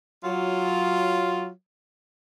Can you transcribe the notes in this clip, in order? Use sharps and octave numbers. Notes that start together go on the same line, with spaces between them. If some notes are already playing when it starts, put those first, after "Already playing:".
F#3 F4